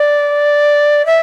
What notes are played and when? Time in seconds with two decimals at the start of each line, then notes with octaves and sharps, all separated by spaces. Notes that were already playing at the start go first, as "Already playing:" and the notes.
Already playing: D5
1.06 E5